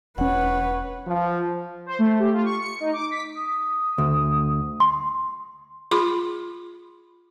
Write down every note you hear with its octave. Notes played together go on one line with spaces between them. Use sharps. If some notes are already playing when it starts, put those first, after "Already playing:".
E1 C#4 B4 C#5 F#5
F3
C5
A3
G4
F4
C#6
C#7
D#4
D6
B6
D#6
D2
C6
F4 G#4 B5 C6 D6